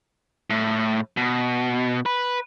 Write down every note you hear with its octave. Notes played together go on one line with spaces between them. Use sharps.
A2
B2
B4